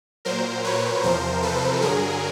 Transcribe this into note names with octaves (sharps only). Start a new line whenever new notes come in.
A#2 F#3 A#4 C5
B4 C#5
E2 C3 F3 A#4 C5
A4 B4
G2 D3 F#3 G#4 A#4